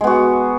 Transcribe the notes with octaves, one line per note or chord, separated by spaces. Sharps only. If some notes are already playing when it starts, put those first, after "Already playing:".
G#3 B3 F#4